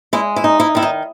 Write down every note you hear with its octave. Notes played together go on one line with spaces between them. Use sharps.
G#3 E4
E4
D#4
E4
D#3 E4
D#4